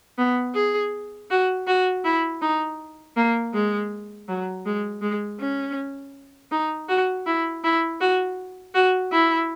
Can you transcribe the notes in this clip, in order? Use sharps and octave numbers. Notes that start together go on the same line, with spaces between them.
B3
G#4
F#4
F#4
E4
D#4
A#3
G#3
F#3
G#3
G#3
C#4
D#4
F#4
E4
E4
F#4
F#4
E4